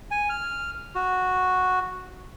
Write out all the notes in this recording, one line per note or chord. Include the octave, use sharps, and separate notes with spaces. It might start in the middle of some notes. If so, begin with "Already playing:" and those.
G#5
F6
F#4